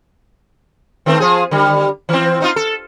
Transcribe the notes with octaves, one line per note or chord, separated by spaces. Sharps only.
D#3 A3 C4
F3 G#4
D3 G3
E3 C4
C4 D#4 F4
A4